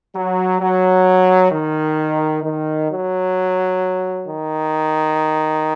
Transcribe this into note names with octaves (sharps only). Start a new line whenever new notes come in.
F#3
F#3
D#3
D#3
F#3
D#3